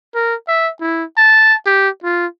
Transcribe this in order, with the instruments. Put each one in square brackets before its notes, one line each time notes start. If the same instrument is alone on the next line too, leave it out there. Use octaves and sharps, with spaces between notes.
[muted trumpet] A#4
E5
E4
A5
G4
F4